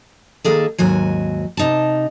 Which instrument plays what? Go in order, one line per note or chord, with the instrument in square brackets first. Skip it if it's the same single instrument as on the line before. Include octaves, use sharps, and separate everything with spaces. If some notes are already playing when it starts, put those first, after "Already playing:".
[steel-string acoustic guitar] D#3 A#3 G#4 A4
D#2 G#2 F#3 G#5
C3 D#4 A5